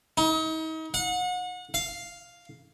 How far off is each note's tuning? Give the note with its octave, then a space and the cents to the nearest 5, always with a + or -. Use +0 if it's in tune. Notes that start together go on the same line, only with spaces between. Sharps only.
D#4 +40
F#5 -35
F5 +0